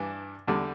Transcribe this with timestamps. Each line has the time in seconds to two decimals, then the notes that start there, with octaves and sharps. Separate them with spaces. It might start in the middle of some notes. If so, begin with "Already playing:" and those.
Already playing: G2 E3 D4
0.47 E2 D3 G3